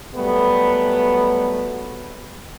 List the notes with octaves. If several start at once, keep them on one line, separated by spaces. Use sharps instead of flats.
F#3 G3 A3 B3